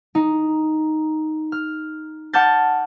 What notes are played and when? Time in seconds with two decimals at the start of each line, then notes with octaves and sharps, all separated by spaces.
0.15 D#4
1.52 F6
2.33 F#5 A5 D6 F6 G6 A6